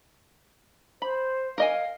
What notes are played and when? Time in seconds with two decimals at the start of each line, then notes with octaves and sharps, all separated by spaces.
1.02 C5 B5
1.58 A#4 D#5 F5 G#5